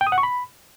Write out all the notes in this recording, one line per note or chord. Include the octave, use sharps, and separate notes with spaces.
G5
D#6
F#5
C#6
B5